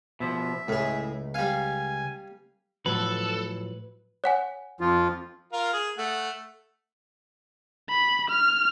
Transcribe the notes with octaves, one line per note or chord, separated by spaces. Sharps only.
B2 F3 E5
C#2 A2 G#4
G3 F5 G#5
A2 F3 F#3 A4 B4
C#5 F#5 G#5
F2 F3 F4
F4 A#4 F5
G#4
A3 F#5
B5
F6